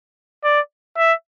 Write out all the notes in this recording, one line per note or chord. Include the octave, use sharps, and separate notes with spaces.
D5
E5